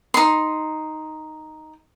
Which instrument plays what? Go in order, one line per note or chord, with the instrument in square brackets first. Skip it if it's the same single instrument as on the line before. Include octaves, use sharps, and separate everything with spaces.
[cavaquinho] D#4 C6